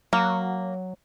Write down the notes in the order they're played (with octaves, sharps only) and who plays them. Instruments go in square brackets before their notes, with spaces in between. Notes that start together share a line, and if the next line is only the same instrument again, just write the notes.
[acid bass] F#3 [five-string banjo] A#3